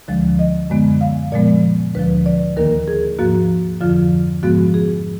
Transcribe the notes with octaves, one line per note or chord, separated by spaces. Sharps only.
D2 D3 F3 G#3
D#5
F#2 D3 G#3 B3
F5
A#2 F3 G#3 B3 D5
D2 D3 F3 B4
D5
D#2 D#3 A#3 A#4
G#4
G#2 F3 A#3 F#4
F2 D3 F3 F4
G#2 F3 G#3 B3 F#4
G#4